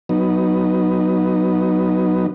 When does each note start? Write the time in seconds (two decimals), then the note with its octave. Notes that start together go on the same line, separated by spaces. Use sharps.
0.09 F#3 B3 D#4